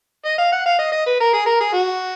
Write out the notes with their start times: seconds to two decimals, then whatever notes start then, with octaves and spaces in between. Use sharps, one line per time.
0.25 D#5
0.38 F5
0.52 F#5
0.66 F5
0.79 D#5
0.92 D#5
1.06 B4
1.20 A#4
1.34 G#4
1.46 A#4
1.60 G#4
1.73 F#4